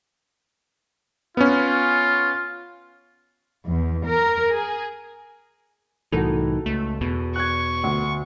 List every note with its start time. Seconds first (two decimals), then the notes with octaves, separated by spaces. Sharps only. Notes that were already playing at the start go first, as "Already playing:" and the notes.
1.37 B3 C#4 F4
3.67 E2
4.06 A#4
4.52 G#4
6.12 C2 A2 E3 D#4 F#4 A4
6.66 C#2 A3
7.01 E2 B2
7.36 C#6 F#6 G#6
7.84 D2